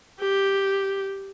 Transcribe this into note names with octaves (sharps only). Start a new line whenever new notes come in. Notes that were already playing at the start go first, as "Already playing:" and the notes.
G4